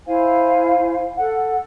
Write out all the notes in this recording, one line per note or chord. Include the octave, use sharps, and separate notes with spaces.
E4 C5 F5 G#5
A4 F#5